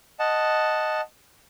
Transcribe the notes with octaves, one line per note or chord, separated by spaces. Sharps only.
D#5 F#5 A5